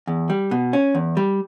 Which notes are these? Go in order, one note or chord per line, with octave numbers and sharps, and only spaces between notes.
E2
G3
B2
C#4
E2
G3